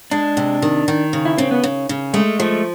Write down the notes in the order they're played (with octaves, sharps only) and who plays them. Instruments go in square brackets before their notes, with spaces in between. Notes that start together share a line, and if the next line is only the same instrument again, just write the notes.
[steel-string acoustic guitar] G#3 [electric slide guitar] D4
[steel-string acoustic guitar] C3
D#3
D#3
C#3
[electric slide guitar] E4
[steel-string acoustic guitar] C#3 [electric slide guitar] C4
[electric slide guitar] B3
[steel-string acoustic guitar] C#3
C#3
[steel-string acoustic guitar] G#3 [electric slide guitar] A3
[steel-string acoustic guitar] F3 [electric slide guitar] A3